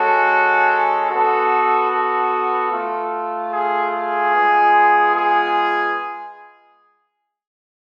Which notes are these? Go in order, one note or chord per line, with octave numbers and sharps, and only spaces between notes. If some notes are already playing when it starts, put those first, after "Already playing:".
Already playing: G#3 C#4 F#4 A4
B3 F#4 A4
A4
A3 F4
G#4
G#4
G#3 B3 F4
G#4